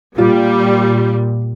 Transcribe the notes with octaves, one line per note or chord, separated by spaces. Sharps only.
A#2 G3 F4